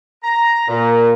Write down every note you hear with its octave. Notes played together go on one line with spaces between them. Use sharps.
A#5
A#2